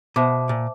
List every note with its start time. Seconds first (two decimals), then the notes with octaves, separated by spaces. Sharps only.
0.16 B2 C5 E5 A5 D6
0.49 A#2